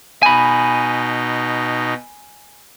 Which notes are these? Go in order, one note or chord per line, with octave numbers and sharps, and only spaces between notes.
B2 D#4 G#5 B5